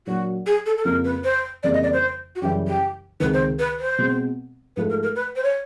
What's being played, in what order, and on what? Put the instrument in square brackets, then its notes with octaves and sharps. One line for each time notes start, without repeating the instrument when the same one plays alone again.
[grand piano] A#2 F#3 A#3 D4 [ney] F#4
[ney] G#4
A4
A4
[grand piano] F2 C#3 F3 A#3 [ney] A#4
[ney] B4
C5
[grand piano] F2 C#3 E3 G3 A#3 [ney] D5
[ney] D#5
D5
C5
F#4
[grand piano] F#2 C#3 E3 G3 [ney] G4
[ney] G4
[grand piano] C#2 C3 D#3 [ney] B4
[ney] C5
B4
C5
[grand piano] B2 G#3 C4
[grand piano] G#2 F3 A3 [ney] B4
[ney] A#4
A#4
B4
C5
C#5